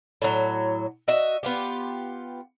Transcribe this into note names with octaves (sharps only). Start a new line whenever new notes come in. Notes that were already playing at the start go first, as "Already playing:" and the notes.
A2 F#3
F#4 D#5 E5
B3 F4 G4